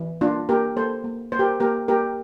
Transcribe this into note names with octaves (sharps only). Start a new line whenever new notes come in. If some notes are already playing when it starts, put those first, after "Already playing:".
Already playing: E3
A#3 D4 F4
A#3 G4 A#4
A#3 A4 C5
A#3
A#3 C5
G4 A#4
A#3 G4 A#4
A#3 G4 A#4